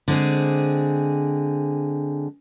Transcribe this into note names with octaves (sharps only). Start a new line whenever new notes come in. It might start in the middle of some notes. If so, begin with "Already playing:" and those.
D3 G#3 C4 G#4